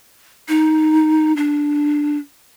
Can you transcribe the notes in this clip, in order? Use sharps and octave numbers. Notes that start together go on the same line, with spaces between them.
D#4
D4